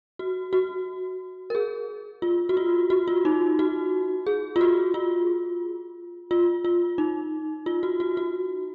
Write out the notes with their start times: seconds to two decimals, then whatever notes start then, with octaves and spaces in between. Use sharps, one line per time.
0.19 F#4
0.53 F#4
1.50 A#4
1.55 G#4
2.22 F4
2.49 F#4
2.57 F4
2.90 F#4
3.08 F4
3.25 D#4
3.59 F#4
4.26 G#4
4.56 F4
4.61 F#4
4.94 F4
6.31 F4
6.65 F4
6.98 D#4
7.66 F4
7.83 F#4
8.00 F#4
8.17 F#4